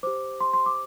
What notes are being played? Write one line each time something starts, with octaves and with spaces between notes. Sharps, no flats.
G4 C5 D6
C6
C6
D6